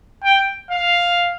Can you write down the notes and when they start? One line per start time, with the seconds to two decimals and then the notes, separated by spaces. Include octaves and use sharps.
0.24 G5
0.71 F5